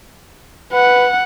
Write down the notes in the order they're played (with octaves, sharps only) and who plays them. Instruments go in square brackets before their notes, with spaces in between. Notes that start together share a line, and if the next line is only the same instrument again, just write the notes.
[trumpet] B4 [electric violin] F#5